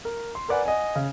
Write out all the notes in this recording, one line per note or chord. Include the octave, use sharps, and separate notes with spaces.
A#4
C6
A#4 B4 D5 F#5 G#5
D#5 F#5 G#5
C#3